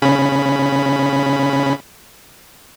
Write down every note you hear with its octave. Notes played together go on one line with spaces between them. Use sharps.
C#3 C#4 B5